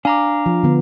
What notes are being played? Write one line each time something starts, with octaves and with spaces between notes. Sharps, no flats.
D4 F5 G#5 A#5 D6
F3
D3 B3